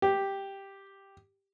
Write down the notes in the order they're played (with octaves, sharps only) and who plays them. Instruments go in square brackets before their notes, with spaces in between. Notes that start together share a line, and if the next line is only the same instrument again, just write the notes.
[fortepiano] G4